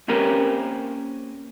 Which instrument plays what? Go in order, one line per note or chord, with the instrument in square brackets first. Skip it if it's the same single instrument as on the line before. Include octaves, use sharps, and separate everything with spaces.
[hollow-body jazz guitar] A#3 C4 C#4 G4 A#4 B4